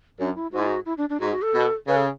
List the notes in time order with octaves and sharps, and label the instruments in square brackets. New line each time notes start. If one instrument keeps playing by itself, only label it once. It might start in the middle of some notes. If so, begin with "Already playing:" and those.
[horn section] F#2 [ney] D4
[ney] E4
[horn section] G#2 [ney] F#4
[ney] E4
F#4
E4
D4
D4
[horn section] G#2 [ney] F#4
[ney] F#4
A4
[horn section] B2
[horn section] C#3 [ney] B4
[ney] A4